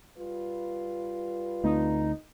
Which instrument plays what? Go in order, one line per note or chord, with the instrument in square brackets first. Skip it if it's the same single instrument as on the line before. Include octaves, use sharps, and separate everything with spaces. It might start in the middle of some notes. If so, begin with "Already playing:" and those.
[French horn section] G3 F4 B4
[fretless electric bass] D2 A3 C4 [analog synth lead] D#4